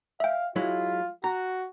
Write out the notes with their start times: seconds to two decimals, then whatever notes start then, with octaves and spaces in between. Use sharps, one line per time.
0.20 E5 F5 G5
0.56 F#3 G#3 E4 F4
1.24 F#4 A#5